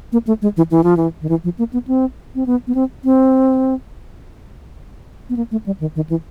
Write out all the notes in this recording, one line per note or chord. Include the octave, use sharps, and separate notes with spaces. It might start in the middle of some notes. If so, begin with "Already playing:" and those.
A#3
A3
G#3
E3
E3
F3
E3
D#3
E3
F3
A#3
B3
C4
C4
B3
B3
C4
C4
B3
A#3
A3
G3
D#3
D#3
E3